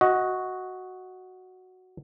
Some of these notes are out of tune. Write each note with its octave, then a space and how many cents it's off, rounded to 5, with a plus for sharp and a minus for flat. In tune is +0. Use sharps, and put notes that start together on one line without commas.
F#4 +0 D#5 +15